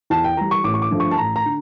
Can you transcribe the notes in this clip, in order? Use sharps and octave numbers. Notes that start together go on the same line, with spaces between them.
E2 A5
G5
E3 G3 A#5
C#6
A1 D6
C#6
D6
G2 D3 F3 A3
C#6
A5
A1 A#5
A#5
D3